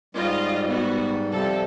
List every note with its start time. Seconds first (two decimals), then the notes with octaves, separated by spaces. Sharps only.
0.15 G#2 G3 F4 D#5
0.67 B3 F#4
1.32 C3 F3 G3 A4